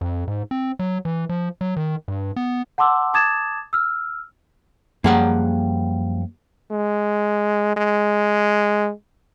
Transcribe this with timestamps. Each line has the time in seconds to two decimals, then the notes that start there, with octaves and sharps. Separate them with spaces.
0.01 F2
0.28 G#2
0.51 C4
0.79 F#3
1.05 E3
1.29 F3
1.61 F#3
1.76 D#3
2.08 G2
2.36 B3
2.78 F#5 A5 C6 D6 E6
3.14 A5 D6 D#6 G#6 A6 E7
3.73 E6 F6
5.04 F#2 F3 G3 A#3 G#4 F#5
6.71 G#3
7.77 G#3